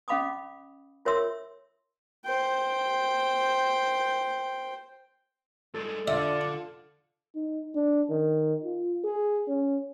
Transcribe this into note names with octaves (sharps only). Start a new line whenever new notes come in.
C#4 D#5 F5 B5 D6 D#6
F4 A#4 C#5 E5 C6 E6
C5 G5
G2 G#3 A4
D3 D4 F4 D5 E5
D#4
D4
D#3
F4
G#4
C#4